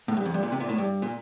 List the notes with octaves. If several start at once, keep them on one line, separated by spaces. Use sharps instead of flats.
A2
G2
F2
G2
A#2
C3
A#2
A2
G2
A#2